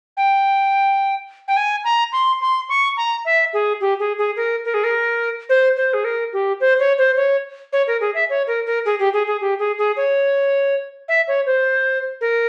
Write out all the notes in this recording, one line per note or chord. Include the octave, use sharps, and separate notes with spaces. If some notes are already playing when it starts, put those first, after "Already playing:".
G5
G5
G#5
A#5
C6
C6
C#6
A#5
E5
G#4
G4
G#4
G#4
A#4
A#4
G#4
A#4
C5
C5
G#4
A#4
G4
C5
C#5
C5
C#5
C#5
A#4
G#4
E5
C#5
A#4
A#4
G#4
G4
G#4
G#4
G4
G#4
G#4
C#5
E5
C#5
C5
A#4